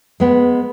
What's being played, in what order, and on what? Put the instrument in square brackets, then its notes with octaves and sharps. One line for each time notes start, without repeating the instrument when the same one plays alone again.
[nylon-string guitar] G#3 B3